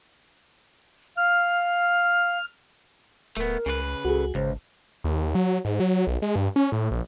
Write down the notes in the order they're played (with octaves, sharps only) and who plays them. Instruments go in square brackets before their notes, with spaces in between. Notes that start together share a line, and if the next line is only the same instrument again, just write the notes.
[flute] F5 [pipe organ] F6
[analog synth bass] D1 [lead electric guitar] A3 B3 [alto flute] A#4
[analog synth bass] C#2 [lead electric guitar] C#3 B4
[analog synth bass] C#2 [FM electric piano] F#4 G#4 [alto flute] A4
[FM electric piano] G#1 [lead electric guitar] C#2 [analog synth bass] C#3 [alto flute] C5
[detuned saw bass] D#2
F#3
G#2
F#3
B1
G#3
G2
C#4
A2
A#1